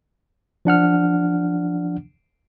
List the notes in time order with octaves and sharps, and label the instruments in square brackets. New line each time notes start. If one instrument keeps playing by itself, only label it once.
[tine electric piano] F3 D4 F#5 F6